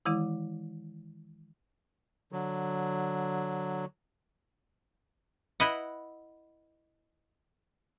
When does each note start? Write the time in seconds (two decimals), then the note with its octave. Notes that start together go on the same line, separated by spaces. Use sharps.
0.06 D#3 E3 G#3 E4
2.32 D3 F#3
5.60 E4 B4 D#5 F#5